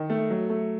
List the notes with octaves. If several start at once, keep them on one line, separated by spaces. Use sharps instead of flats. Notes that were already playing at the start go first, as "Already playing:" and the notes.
Already playing: D#3
A3
F#3
A3